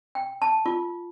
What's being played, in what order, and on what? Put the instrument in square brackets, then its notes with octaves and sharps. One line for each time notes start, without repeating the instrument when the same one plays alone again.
[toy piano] G5
A5
F4